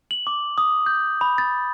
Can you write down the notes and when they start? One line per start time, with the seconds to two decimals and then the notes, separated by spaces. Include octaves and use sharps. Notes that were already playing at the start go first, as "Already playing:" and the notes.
0.11 F#7
0.27 D6
0.58 D#6
0.86 G6
1.21 B5
1.38 A6